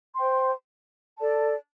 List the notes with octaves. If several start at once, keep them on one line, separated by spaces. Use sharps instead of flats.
C5 G5 C6
A4 D5 A5